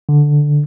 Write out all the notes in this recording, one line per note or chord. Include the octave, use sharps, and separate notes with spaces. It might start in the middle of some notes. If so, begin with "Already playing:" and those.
D3